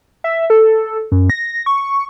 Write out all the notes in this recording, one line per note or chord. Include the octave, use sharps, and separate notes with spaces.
E5
A4
F#2
A#6
C#6